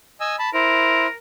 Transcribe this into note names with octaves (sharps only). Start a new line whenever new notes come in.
D#5 G#5 E6
A5 B5
E4 A#4 C5